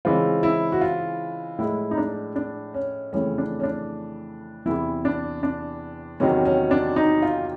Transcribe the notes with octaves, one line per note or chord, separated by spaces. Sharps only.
C#3 E3 G#3 C4 F4
E4
F#4
F4
A2 F3 G#3 E4
D#4
D4
D4
C#4
F2 C#3 E3 A3 C#4
D4
C#4
D4
E2 C3 E3 E4
D4
D4
E2 C3 D#3 F#3 C#4
C#4
D4
D#4
F4